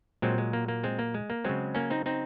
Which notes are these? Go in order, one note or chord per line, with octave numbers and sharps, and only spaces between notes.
A#2 F#3 G#3 C4
G#3
A#3
A#3
G#3 C4
A#3
G#3
A#3
C#3 F#3 G#3 C4
A#3 C#4
C4 D#4
C4 D#4